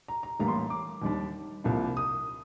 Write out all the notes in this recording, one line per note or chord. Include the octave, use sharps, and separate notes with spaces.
A#5
A#5
A1 A2 G3 A#3 D4 A#5
C6
A#5
D6
D#2 D#3 G3 D4
C2 C3 F3 A#3 D4
D#6